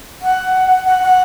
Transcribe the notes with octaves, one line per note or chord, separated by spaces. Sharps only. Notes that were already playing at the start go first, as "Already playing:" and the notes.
F#5
F#5
F#5